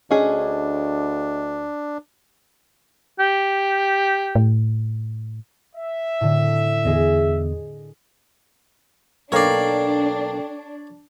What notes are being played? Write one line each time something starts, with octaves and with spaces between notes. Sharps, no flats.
D2 C#4 D4 G#4 D#5
G4
A2
E5
A2 D3
E2 D3 G#4 D#5
B1 A#3 D4 A4 C#5 D5 G5 C7